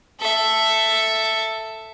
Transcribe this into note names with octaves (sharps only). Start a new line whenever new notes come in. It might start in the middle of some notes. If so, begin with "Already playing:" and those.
A4 E5